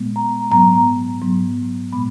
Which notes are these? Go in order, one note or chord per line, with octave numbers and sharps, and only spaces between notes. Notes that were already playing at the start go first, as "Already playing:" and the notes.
Already playing: A#2 G#3 B3
A#5
G#2 F#3 B3 A#5
G#2 F#3 B3
A#2 G#3 B3 B5